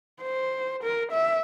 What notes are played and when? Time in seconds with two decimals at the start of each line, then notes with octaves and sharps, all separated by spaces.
0.22 C5
0.83 A#4
1.12 E5